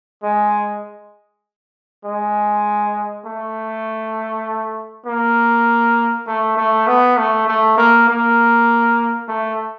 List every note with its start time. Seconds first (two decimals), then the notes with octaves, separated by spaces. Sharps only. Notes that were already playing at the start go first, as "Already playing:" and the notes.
0.23 G#3
2.05 G#3
3.25 A3
5.06 A#3
6.27 A3
6.57 A3
6.87 B3
7.17 A3
7.47 A3
7.78 A#3
8.08 A#3
9.28 A3